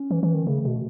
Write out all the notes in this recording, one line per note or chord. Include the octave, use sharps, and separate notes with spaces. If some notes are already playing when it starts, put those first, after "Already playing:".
Already playing: C#4
E3
E3
D#3
C#3 A3
B2